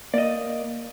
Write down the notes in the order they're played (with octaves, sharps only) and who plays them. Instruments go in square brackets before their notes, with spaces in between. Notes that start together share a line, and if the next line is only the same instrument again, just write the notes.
[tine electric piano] A#3 [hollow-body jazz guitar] D5 D#5